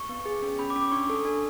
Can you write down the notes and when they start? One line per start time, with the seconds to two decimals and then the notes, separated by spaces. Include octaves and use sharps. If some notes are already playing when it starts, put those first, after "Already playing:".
Already playing: C#6
0.09 B3
0.25 G#4
0.42 C#4
0.59 C#4 B5
0.70 D6
0.76 C#4
0.82 D6
0.92 D4 C#6
1.09 A4
1.25 D4